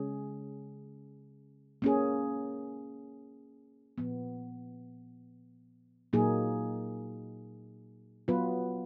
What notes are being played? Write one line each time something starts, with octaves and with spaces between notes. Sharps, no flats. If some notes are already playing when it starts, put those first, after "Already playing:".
Already playing: C#3 G#3 C#4 G#4
A#3 C#4 G#4
A#2 F3 B3
A#2 F#3 A#3 D#4 G#4
F#3 B3 F4 B4